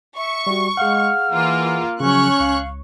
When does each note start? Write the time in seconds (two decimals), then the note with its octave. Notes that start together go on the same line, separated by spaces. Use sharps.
0.16 E5 C#6
0.47 G3 F#4
0.77 G#3 G#4 F5 F#5 F6
1.31 E3 A#3 F4
2.00 C#3 F3 F#3 C#4 C#5 C#6 F#6
2.40 C#2 F5